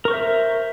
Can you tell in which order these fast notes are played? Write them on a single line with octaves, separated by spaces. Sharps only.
A#4 C#6 C5 E5